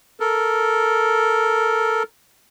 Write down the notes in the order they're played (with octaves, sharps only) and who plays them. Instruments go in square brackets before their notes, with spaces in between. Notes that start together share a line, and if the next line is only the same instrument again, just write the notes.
[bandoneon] A4 A#4